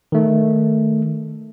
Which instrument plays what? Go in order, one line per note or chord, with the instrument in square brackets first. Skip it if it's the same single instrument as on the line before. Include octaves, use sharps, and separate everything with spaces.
[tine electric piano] D#3 A3